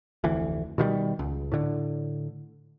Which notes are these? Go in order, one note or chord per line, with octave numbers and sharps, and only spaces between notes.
F1 D2 E3
B2 D#3 F3 G3
C#2
A2 D3